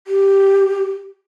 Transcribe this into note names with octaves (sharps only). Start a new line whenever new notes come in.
G4